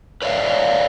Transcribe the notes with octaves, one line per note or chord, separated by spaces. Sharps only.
B4 C#5 D5 E5 F5